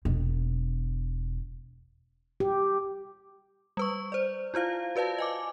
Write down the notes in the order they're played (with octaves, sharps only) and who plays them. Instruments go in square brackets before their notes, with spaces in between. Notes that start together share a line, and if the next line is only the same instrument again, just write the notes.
[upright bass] E1 B2
[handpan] G4
[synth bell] G3 B4 C#6
C5 D5
E4 F4 C5 F5
F#4 B4 D5 F5 A5
D#5 G#5 D6